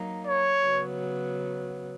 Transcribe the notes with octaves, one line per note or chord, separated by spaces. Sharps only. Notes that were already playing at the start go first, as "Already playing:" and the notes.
Already playing: F#3 A#3 D#4
C#5
C#3 F#3 B3